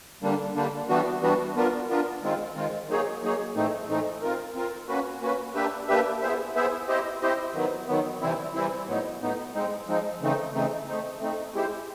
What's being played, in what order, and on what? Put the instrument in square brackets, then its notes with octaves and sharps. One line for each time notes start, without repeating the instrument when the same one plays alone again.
[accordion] D3 G3 A#3 D4
D3 G3 A#3 D4
E3 G3 B3 D4 F#4
E3 G3 B3 D4 F#4
B3 D4 F4 A#4
B3 D4 F4 A#4
D#3 G#3 C4 F4
D#3 G#3 C4 F4
F#3 A#3 D#4 G#4 C#5
F#3 A#3 D#4 G#4 C#5
A2 E3 A3 C4 D#4
A2 E3 A3 C4 D#4
C4 F4 A#4
C4 F4 A#4
A#3 C#4 F#4 B4
A#3 C#4 F#4 B4
A#3 D4 G4 B4 E5
A#3 D4 G4 B4 E5
B3 E4 G#4 C5 E5
B3 E4 G#4 C5 E5
C4 E4 G4 C5 D#5
C4 E4 G4 C5 D#5
D#3 F#3 B3
D#3 F#3 B3
C3 E3 G3 C4 E4
C3 E3 G3 C4 E4
A2 F#3 B3 D#4
A2 F#3 B3 D#4
F3 G#3 C4 D#4
F3 G#3 C4 D#4
C#3 E3 A3 C4 D#4
C#3 E3 A3 C4 D#4
A3 C4 D#4
A3 C4 D#4
G#3 C4 E4 G4 C5